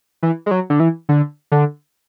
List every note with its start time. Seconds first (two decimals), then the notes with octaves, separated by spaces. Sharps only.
0.23 E3
0.46 G#3
0.51 F#3
0.70 D3
0.80 E3
1.09 D3
1.52 D3